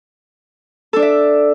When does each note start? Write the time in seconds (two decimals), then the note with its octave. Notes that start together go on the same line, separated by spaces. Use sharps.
0.93 A4
0.96 D4
0.99 D5
1.02 E5